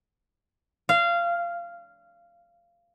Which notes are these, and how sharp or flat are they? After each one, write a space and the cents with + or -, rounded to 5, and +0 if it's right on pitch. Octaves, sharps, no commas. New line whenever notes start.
F5 -20